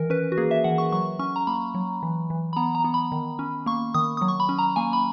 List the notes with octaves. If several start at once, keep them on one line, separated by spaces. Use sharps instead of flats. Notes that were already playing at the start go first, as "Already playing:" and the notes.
Already playing: D#3 E3 A#4
C#4 B4
F#4
A#3 G#4
E5
E3 F#5
C#6
F#3 C#6
C#4 C#6
A#5
A#3 B5
F#3
E3
E3
B5
B3 A#5
A#5
B3
B5
D#3
C#4
A#3 C#6
D#3 D#6
F#3 D#6
C#6
B5
C#4
A#5
A#3 G#5
B5